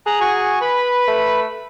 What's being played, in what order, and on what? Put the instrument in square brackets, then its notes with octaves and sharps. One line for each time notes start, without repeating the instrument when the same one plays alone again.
[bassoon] G#4 [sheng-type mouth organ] A#5 F#6
[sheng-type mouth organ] F#4 G#5 C#6
B4 B5
[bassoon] A3